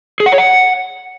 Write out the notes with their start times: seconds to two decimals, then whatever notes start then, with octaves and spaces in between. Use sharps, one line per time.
0.20 G#4
0.26 F#5
0.32 C#5
0.38 F#5